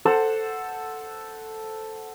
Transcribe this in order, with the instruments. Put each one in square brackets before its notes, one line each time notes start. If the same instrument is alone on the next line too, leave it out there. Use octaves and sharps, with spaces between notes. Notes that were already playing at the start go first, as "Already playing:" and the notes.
[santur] A4 C5 F#5